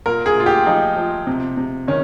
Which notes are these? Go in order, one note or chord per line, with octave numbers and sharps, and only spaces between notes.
A#2 A#4
G#4
A#2 F4
G4
F3 D#4
F3
C3
C3
D#3 C#4